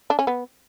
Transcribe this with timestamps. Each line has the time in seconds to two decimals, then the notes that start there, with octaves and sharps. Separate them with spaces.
0.10 D4
0.19 C#4
0.27 B3